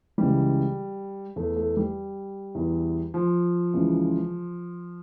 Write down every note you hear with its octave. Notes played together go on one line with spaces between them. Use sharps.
C#2 C#3 E3 G3
E2 E3 A3
A3
G3
E2 E3
F3
C#2 C#3 E3